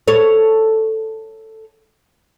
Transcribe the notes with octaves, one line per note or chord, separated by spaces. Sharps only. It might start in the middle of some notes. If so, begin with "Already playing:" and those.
A4 C#5